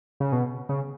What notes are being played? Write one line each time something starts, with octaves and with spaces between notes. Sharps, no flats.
C#3
B2
C#3